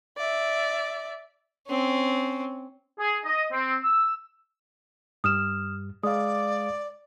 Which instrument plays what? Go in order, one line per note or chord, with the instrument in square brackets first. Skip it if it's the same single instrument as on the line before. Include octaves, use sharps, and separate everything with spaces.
[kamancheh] D5 E5
[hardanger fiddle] C4 C#4
[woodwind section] G#4
D#5
C4
E6
[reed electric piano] G2 G3 [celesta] D#6 F6 E7
[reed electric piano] G#3 F5 [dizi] D5 [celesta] D#6